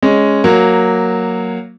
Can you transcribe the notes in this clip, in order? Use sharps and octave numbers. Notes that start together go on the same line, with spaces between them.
G#3 C#4
F#3 A#3